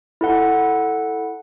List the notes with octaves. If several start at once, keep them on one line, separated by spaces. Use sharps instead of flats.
E4 A4 F#5